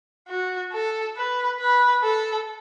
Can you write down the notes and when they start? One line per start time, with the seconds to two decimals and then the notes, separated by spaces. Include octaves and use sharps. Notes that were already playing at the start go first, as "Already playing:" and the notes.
0.28 F#4
0.73 A4
1.16 B4
1.60 B4
2.04 A4